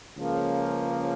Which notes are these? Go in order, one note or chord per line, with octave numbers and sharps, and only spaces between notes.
C#2 C#3 F3 A#3